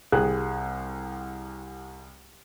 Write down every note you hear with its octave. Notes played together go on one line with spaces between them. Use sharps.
C2 G4 G#4 F#6